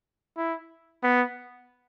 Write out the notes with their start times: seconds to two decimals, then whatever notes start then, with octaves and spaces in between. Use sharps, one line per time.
0.37 E4
1.03 B3